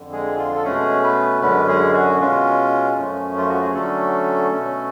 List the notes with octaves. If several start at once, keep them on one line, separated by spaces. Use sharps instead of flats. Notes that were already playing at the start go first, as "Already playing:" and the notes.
Already playing: F2 D3
G#3 G#4
F4
A4
B2 G#3 A3 C#4 G#4
B3 B4
F#2 D3 G#3 B3 C#4 B4
G#3 G#4
F#4
B2 G#3 C#4 F4
F#2 F3 A3 C#4
F4
F#4
G#4
D3 F#3 A3 C#4 A4
B2 A3 C#4